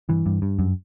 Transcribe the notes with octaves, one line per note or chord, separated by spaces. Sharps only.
G2 E3
G2
G2
F#2